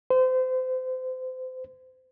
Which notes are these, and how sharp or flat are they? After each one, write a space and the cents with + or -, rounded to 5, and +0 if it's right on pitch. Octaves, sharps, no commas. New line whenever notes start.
C5 -30